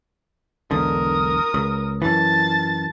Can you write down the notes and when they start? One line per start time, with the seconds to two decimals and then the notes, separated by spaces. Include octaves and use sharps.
0.71 E1 B1 D3 A#4 D#6
1.54 C#2
2.02 F#2 E3 A5 A6